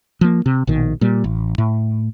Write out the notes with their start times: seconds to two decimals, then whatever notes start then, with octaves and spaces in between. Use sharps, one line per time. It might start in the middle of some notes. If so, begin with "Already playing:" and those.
0.21 F3 A#3
0.46 C3
0.67 A#1 B2 D#3
1.01 A#2 G3
1.24 A1
1.58 A2